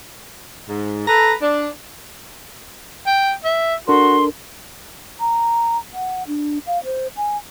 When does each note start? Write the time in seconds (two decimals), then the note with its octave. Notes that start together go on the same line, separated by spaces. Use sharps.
0.68 G#2
1.08 A4 B4 A#5
1.41 D4
3.06 G5
3.44 E5
3.88 D4 F#4 A4 A#4 C6
5.20 A#5
5.94 F#5
6.28 D4
6.67 F5
6.85 C5
7.17 G#5